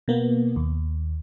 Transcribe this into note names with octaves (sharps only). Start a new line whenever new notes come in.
B2 A#3 B3
D#2